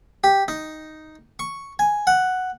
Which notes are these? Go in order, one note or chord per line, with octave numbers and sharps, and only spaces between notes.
G4
D#4
C#6
G#5
F#5